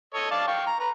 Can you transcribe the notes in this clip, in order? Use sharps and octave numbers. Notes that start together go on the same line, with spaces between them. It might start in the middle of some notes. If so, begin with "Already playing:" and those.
A4 C#5 D#5
D5 F5 A5
F5 G5 C#6
A#5
B4 A#5